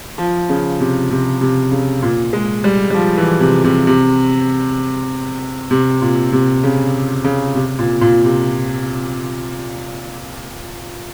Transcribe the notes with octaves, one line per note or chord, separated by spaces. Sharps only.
F3
C#3
C3
C3
C3
C#3
A#2
G#3
G3
G3
F3
E3
C3
C3
C3
C3
A#2
C3
C#3
C#3
C3
A#2
A#2
C3